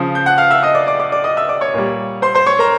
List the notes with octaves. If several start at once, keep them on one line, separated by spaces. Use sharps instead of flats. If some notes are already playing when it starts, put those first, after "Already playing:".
Already playing: C#3 F3
G6
F#5 F#6
F5 F6
E5 E6
D#5 D#6
D5 D6
D5 D6
D5 D6
D5 D6
D#5 D#6
E5 E6
D5 D6
C#5 C#6
A#2 G3
C5 C6
C5 C6
C#5 C#6
A#4 A#5